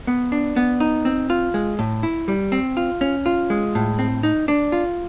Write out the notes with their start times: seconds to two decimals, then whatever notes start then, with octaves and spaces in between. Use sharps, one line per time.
0.07 B3
0.32 D4
0.56 B3
0.80 D#4
1.05 C4
1.30 F4
1.54 G#3
1.79 A2
2.03 E4
2.28 G3
2.52 C4
2.77 F4
3.01 C#4
3.26 F4
3.50 G#3
3.75 A2
3.99 C4
4.23 D#4
4.48 D4
4.72 F4